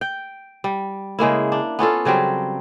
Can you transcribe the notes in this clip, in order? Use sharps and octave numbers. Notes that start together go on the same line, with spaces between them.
G5
G3
C#3 G#3 A#3 E4
D4
B3 C#4 F4 A4
C#3 F#3 G3 C4